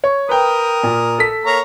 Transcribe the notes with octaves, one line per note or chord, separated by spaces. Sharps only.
C#5
A#4 B4 G5 D#6
A#2
A4 B6
A#3 C#5 A#5